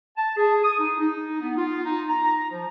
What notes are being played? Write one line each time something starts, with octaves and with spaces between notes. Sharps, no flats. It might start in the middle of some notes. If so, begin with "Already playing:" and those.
A5
G#4
D#6
D#4
D#4
B3
F4
D#4
A#5
F3